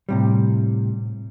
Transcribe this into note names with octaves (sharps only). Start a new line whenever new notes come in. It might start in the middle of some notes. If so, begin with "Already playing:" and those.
A2 C3 G3